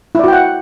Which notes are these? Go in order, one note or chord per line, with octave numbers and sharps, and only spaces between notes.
E4 F#4 D5 F#5 G5